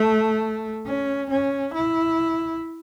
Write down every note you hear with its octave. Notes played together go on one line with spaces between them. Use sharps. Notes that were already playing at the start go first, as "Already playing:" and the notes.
Already playing: A3
C#4
C#4
E4